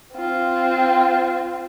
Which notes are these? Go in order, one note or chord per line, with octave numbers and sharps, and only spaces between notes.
C4 F4